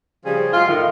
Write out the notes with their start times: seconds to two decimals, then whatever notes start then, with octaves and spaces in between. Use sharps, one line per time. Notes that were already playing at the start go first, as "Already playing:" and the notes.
0.24 C#3 F3 G3 G#4
0.52 F#2 G#3 F4
0.67 A2 D#3